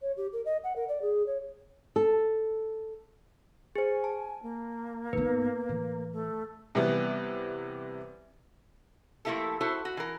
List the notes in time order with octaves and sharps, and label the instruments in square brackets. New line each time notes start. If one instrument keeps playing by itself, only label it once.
[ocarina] C#5
G4
A#4
D#5
F#5
A#4
D5
G#4
C#5
[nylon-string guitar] A4
[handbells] G#4 C5 [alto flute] G#5
[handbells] A5
[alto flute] A#3
[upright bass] G#2 B3 [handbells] B4
[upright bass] A2 E3
[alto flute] A3
[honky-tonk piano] C3 E3 G3 B3
[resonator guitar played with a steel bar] F3 A3 A#3 E4 G4 A4
E4 F#4 A4 C5
F#4
E3 A#4